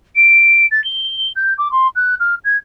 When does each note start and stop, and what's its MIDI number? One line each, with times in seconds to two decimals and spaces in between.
0.16 0.66 98
0.71 0.83 93
0.84 1.30 103
1.36 1.53 91
1.58 1.71 86
1.72 1.87 84
1.96 2.15 90
2.20 2.35 89
2.44 2.57 92